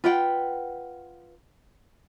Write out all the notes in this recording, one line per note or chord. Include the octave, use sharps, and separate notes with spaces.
F4 B4 F#5 G5